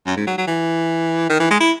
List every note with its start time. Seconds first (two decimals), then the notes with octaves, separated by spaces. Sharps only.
0.06 F#2
0.17 G#2
0.27 F#3
0.38 F#3
0.47 E3
1.30 D#3
1.40 E3
1.51 G#3
1.61 E4